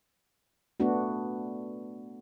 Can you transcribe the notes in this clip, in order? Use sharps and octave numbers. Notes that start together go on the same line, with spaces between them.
A3 B3 D4 F#4